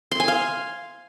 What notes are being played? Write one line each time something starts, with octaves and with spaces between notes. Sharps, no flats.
C6
G#5
F5